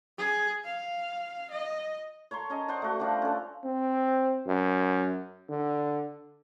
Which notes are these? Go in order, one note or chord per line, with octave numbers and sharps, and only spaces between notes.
G#4
F5
D#5
C#5 A5 A#5 C6
C#4 D#5
C5 D5 F#5 A5
A3 F#4
F3 G3 D4 F#4
C#4 A4
C4
F#2
D3